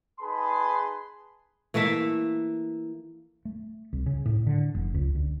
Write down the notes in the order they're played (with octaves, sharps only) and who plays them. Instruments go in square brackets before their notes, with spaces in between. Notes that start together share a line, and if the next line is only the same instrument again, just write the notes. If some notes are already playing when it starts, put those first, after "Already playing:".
[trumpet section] D#4 G#4 B4 A5 B5 C6
[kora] E3 A3 A#3 E5
[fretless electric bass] A3
C2
C#3
A2
D3
F1
C#2
D2